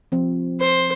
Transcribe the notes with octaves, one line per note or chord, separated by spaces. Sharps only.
F3 C4
C5